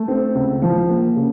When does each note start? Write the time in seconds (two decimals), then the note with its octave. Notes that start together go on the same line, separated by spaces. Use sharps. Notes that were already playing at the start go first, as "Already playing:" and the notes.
Already playing: A3
0.08 C4
0.35 C#2
0.62 F3
0.89 A#3
1.16 C#3